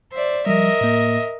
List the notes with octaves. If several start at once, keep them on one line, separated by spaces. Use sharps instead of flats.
C5 D5 E5
F3 G3 A#4 D#5 E5
A2 A#3